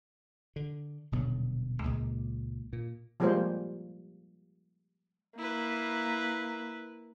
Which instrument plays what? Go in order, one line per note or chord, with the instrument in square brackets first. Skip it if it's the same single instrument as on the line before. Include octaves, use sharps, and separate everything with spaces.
[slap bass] D3
D#1 B2 D3 F#3
C#2 A#2 G#3
A#2
[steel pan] F3 G3 G#3 A#3 F4 C5
[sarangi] A#3 [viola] E4 B4